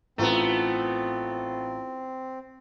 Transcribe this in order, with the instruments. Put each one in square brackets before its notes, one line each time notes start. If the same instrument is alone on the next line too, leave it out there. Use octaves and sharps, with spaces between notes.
[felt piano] A1 F4 A#5 [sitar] A3 B3 [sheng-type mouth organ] C4